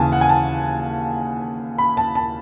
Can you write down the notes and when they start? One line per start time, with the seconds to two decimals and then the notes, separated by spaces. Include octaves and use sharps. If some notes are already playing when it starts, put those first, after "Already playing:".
Already playing: D#2 C#3 E3 G#5 A5
0.12 F#5
0.21 G#5
0.29 A5
1.78 B5
1.97 A5
2.15 A5